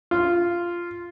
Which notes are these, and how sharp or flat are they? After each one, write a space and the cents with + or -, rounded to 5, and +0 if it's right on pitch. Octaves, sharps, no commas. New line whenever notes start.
F4 -10